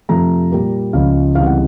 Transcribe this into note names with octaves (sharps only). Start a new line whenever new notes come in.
F2 C3 F3 A3 A#5
A#2 G3 A#3
C#2 C#3 F3 F5
C#2 C3 E3 G3 F5
F#5